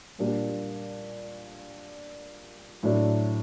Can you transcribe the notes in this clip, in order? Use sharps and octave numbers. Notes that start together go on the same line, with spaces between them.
A#2 G3 A#3 D4
A2 F#3 A3 D4